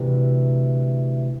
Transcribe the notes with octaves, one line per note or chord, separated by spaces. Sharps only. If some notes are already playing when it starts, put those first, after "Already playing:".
Already playing: D2 C3 E3